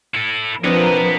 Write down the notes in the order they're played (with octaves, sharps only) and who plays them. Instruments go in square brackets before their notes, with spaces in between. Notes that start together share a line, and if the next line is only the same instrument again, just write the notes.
[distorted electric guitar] E4 A4
[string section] F3 A#4 [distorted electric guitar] B3 D#5 [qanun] C4 D4 C#5 [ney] B4